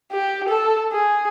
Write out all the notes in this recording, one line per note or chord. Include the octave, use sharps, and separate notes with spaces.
G4
A4
G#4